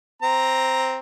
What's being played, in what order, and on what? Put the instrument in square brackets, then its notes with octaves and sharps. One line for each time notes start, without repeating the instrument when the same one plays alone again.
[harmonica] C4 A#5